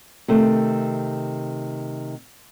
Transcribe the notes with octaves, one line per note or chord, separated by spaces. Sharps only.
C3 D#3 A3